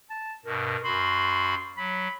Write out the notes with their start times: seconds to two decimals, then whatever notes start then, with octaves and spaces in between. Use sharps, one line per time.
0.10 A5
0.45 G2 B2 A#4
0.84 F#2 F#4 B5 C6
1.77 F#3 B5